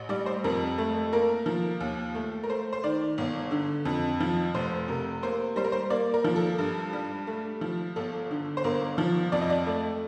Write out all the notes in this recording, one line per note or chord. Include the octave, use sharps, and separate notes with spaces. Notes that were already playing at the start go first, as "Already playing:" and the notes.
Already playing: A1
G3 D5
C5
F2 A#4
A3
A#3 A#4
F3
D#2
A3
A#4
A3 C5
C5
D#3 D5
G1
D3
F2
F3
F1 C5
C3 A#4
A#3 C5
G3 C5
A#4
C5
A#3 D5
A#4
F3
A4
G2
G3
A3
F3
G1 A4
D3
C5
G1 A#4
F3
F2 D5
D#5
D5
A3